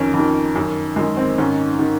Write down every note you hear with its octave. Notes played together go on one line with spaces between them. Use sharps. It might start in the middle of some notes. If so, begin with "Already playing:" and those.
Already playing: F2 D#3 C#4 A#4
F2 D#3
F#2 D#3
F#2 D#3 G#3
C4
G#2 D#3 C#4
D#3